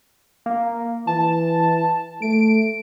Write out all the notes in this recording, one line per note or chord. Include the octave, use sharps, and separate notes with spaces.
A#3
E3 A5
A3 D7